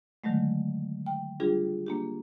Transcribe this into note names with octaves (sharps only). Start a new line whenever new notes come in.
D3 D#3 F#3 G#3 A3
G5
G3 D4 F4 G4 G#4
A#3 D4 G4